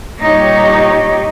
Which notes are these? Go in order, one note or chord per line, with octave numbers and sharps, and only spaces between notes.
A#2 G3 D#4 G4 C#5